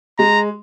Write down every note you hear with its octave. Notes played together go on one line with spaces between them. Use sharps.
G#3 A#5